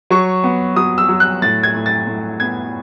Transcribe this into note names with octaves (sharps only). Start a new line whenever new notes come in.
F#3 C#6
B3
F#3 D#6
E6
F#3
F#6
A2 A6
G#6
A2
A6
A2
B3 G#6